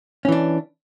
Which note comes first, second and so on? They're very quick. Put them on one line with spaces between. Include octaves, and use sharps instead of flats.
C#4 E3 D4